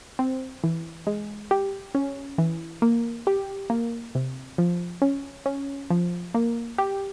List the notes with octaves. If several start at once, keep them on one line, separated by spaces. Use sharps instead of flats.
C4
E3
G#3
G4
C#4
E3
A#3
G4
A#3
C3
F3
C#4
C#4
F3
A#3
G4